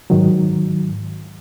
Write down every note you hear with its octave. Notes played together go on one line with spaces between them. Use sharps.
G#2 D#3 F#3